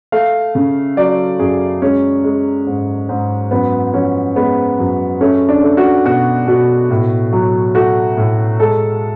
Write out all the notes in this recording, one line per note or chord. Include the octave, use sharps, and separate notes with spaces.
A3 F5
C#3
F#3 D5
F#2 G#4
G#3 C#4
G#3
G#2
G#2
F#2 B3
F3 C#4
G#3 B3
F#2
A3 C#4
D4
A3
F#4
B2 F#4
B2
A2
F#3
A3 F#4
A2
G#3 A4